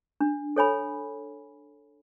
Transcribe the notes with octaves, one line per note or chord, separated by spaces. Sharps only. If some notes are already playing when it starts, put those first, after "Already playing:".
D4
A4 C#5 G#5 B5